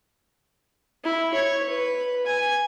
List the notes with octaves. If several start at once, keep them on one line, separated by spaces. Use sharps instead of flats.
E4
C#5
B4
G#5